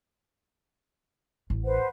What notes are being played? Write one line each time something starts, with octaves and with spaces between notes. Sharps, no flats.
A1
B4 C5 F#5